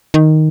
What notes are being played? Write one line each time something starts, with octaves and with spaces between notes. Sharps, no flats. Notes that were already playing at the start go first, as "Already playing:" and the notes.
D#3